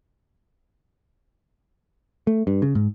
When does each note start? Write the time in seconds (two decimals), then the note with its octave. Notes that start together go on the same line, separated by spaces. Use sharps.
2.27 A3
2.47 G2
2.62 C#3
2.75 G#2